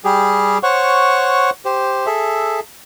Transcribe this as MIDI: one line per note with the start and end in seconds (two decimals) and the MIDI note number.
0.05 0.58 55
0.05 0.58 67
0.05 0.58 68
0.63 1.50 72
0.63 1.50 73
0.63 1.50 78
0.63 1.50 85
1.65 2.06 67
1.65 2.06 72
2.06 2.60 68
2.06 2.60 69
2.06 2.60 76